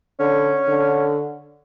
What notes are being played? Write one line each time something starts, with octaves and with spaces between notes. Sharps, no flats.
D3 C#4
D3